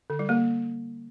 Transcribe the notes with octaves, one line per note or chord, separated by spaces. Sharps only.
D3
G3
A#3